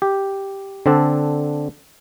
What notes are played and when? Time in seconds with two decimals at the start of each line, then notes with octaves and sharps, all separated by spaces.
0.02 G4
0.86 D3 C4 D4 A4